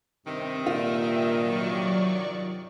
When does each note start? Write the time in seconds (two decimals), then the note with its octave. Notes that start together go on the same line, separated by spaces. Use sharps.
0.24 G2 C3 D#3 C4
0.66 A#2 F4 E5
1.42 F#3 D5 C#6